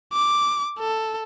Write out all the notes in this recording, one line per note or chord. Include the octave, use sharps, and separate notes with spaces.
D6
A4